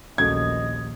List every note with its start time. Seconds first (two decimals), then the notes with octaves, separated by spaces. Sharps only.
0.18 A#1 D#2 C#3 F#3 A3 D#5 G#6